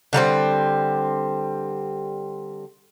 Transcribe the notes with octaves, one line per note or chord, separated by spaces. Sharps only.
D3 G3 A3 C4